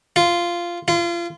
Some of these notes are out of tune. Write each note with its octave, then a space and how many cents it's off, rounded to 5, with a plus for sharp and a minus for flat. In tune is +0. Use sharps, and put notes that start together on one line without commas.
F4 -10
F4 -30